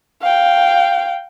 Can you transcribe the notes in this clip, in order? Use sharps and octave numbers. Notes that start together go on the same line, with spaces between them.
F5 G5